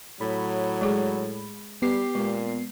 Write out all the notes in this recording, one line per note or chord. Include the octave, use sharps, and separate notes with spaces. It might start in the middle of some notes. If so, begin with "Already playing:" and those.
A2 F#3 B5
G#3 G#4
G3 B3 G4 C7
A#2 G#3